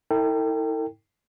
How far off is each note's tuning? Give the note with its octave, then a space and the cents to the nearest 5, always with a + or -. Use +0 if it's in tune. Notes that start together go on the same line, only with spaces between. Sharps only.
E4 -40 A4 +45 G5 +5